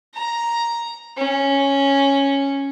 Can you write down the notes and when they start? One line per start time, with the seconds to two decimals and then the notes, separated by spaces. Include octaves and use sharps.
0.15 A#5
1.17 C#4